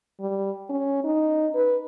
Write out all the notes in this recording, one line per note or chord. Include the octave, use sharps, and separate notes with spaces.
G3
C#4
D#4
B4